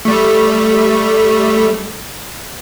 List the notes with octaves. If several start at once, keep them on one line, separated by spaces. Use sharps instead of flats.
G3 A3